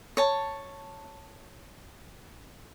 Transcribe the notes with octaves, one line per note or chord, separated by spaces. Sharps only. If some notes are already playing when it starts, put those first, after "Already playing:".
C#5 A5